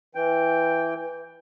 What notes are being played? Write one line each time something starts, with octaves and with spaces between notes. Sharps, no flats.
E3 G5